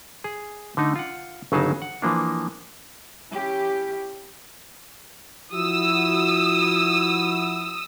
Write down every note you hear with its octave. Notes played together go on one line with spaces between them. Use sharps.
G#4
D3 A3 D#4
F4 F#5
G1 C#3 F#3 D#4 G#4 A5
F#5
E3 F3 A#3 D4
C#4 E4 G4
F3 E4 F#4 D#6 E6